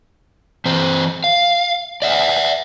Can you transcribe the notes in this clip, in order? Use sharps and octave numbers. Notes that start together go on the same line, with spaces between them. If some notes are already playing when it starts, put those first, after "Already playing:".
E3 C4 C5
F5
D5 E5 F#5